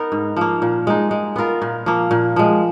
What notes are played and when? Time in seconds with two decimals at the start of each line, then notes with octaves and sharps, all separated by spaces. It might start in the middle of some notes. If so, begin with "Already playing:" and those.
Already playing: B3 D#4 A#4
0.12 G#2
0.36 F3 A#3
0.62 A#2
0.87 G#3 D#4
1.11 G#3
1.36 B3 F4 A#4
1.62 A#2
1.86 F3 A#3
2.11 A#2
2.36 F3 G#3